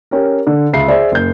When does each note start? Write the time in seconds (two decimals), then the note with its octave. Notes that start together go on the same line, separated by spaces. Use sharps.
0.11 C#4 G4 A#4
0.47 D3
0.73 C#2 E5 C7
0.88 G#4 C5 D5 E5
1.12 F#1 G6